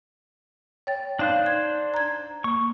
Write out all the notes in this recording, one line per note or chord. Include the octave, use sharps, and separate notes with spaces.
C#5 G5 A6
D4 D#4 C5 F5 F#6
G#6
A#5 G#6
A#3 C#6